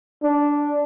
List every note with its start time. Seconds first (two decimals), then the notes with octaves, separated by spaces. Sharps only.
0.23 D4